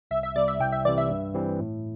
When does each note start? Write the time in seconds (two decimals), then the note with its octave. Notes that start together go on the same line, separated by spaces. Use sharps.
0.11 C2 E5
0.23 E5
0.35 C3 G3 D5
0.48 E5
0.60 C2 G5
0.72 E5
0.85 C3 E3 D5
0.98 E5
1.10 G2
1.34 E3 G3 C4
1.59 A2